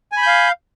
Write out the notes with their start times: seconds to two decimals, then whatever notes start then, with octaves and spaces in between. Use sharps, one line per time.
0.12 G#5
0.17 B5
0.22 G6
0.27 F5